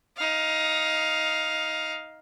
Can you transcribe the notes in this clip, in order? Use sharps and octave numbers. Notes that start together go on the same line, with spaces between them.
D#4 F5